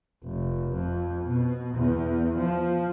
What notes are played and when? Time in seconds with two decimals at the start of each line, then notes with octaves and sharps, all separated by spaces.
0.23 F1
0.74 F2
1.26 B2
1.75 E2
2.38 F3